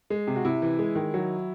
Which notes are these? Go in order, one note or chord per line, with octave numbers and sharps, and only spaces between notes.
G#3
C3
F#4
C3 E4
E3
G#3
D#3
F#3